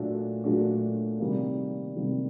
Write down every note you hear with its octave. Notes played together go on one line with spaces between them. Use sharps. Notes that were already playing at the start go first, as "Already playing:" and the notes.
Already playing: A#2 F#3 A3 D4 F#4
A#2 F#3 A3 D4 F#4
C3 D#3 G3 A#3
C3 D#3 G3 A#3